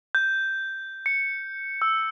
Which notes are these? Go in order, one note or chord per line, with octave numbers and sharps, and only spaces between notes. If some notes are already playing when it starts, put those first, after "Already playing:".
G6
C#7
E6